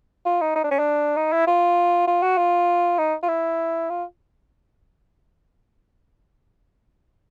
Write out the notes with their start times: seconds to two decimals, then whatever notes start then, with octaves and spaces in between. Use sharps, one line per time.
0.25 F4
0.41 D#4
0.56 D#4
0.64 D4
0.71 C#4
0.79 D4
1.16 D#4
1.32 E4
1.47 F4
2.07 F4
2.23 F#4
2.38 F4
2.98 D#4
3.22 F4
3.28 E4
3.90 F4